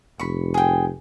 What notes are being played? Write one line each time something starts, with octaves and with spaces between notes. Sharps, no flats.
F1 B5 C#6
G#4 G5